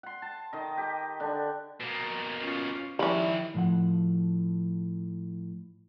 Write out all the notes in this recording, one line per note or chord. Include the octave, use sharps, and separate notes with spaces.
F#5 C6
A5
D#3 D#5
G4
D3 D4
B2 A#3
C#4 F4
D#3 F3 G3 C#4 E4 B5
A2 F3 F#5